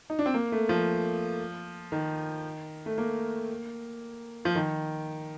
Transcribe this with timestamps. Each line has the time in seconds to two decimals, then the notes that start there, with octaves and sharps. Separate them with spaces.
0.10 D#4
0.19 D4
0.26 C4
0.34 A#3
0.52 A3
0.69 F3
1.92 D#3
2.86 A3
2.98 A#3
4.45 F3
4.55 D#3